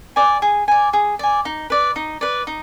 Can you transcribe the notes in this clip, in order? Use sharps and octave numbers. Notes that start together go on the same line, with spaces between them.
D5 G#5
G#4
D5 G#5
G#4
D5 G#5
D#4
B4 D5
D#4
B4 D5
D#4